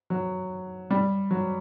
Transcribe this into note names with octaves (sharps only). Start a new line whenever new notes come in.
F#3
G3
F#3